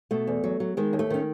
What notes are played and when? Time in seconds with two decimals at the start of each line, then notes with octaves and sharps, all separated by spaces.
0.11 B2 A3
0.27 E2
0.44 F#3
0.60 F#3
0.77 D#3 G#3
0.93 D#2
0.99 A3
1.10 D#3 C#4